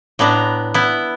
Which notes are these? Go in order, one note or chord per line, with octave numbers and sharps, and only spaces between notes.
A2 B3 D4 A#5
B3 E4